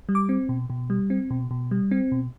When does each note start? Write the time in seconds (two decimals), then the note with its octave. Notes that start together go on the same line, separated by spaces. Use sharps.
0.09 G3
0.15 D6
0.29 C4
0.49 B2
0.70 B2
0.90 G3
1.10 C4
1.30 B2
1.51 B2
1.71 G3
1.91 C4
2.12 B2